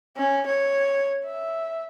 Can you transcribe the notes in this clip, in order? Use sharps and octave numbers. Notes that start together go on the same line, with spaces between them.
C#4
C#5
E5